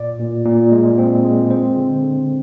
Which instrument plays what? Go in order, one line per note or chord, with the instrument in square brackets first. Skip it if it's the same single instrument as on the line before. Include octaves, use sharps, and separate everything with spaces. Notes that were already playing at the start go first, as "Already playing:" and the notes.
Already playing: [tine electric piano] A#2 D5
A#2
A#2
G#3
C4
G#3
C4 C5
D3
D3